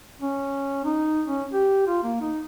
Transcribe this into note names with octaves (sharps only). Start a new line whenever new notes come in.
C#4
D#4
C#4
G4
F4
A#3
D#4